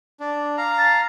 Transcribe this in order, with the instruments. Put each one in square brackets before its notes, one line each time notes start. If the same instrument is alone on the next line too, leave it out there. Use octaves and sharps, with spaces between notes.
[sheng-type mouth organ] D4
F5 A#5
[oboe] A5